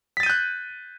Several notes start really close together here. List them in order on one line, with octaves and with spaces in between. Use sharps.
B6 A6 D#7 G6 F#6